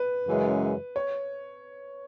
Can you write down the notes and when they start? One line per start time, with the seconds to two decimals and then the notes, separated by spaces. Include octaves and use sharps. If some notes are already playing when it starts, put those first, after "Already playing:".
Already playing: B4
0.27 F#2 C#3 E3 G#3
0.96 C#5